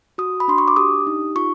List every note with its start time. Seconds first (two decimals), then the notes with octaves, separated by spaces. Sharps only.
0.18 F#4 D#6
0.40 B5
0.48 D4 C6
0.58 C#6
0.68 D6
0.76 G4 D#6
1.07 D#4
1.36 F4 C#6